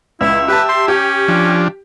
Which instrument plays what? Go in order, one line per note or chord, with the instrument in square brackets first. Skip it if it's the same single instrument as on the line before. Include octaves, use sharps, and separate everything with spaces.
[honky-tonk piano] C#2 [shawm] E4 [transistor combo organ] E5
[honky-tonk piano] G4 A5 [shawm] B4
[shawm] C6
[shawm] C#4 [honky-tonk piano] G4
[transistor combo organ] F3 D4